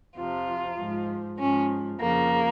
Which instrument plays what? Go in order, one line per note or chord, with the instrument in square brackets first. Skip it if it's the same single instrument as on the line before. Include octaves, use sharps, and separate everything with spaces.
[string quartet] F2 C3 F3 F4
G#2 F3
G#2 F3 C#4
F2 C#3 F3 A#3